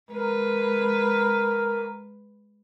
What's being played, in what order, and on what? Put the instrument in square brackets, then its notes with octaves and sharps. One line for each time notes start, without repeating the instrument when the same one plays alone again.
[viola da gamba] G#3 B4 [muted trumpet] A#4